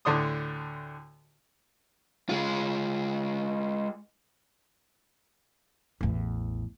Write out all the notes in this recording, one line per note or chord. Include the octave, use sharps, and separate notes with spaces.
D2 A2 D3 D5 C6 D#6
G#3 F4
A1 E2